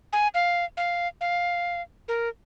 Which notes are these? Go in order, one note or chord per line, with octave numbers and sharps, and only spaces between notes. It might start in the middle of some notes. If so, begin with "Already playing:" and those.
G#5
F5
F5
F5
A#4